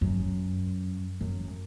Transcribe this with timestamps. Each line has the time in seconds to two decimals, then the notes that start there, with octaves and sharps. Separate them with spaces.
0.01 F#2
1.21 F#2